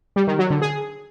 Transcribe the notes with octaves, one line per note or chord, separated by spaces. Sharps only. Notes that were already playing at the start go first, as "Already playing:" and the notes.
G3
D#3
F#3
D3
G#4